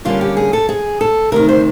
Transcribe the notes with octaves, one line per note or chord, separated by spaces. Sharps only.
D3 G3 A#3 C#4 F4
G4
G#4
A4
G#4
A4
D2 C3 D#3 A#4
C5